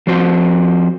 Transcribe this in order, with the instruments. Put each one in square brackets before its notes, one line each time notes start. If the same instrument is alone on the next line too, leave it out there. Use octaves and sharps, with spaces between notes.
[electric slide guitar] F3 C4 F#4 C5